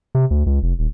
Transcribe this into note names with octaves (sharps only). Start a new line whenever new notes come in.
C3
D2
C#2
F1
D#1